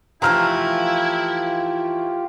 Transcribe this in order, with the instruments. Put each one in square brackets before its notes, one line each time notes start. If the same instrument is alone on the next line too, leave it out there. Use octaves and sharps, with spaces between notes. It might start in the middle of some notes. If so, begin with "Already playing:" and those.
[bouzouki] E3 F3 A3 [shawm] E4 [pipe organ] F4 G4 [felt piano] A#5 F6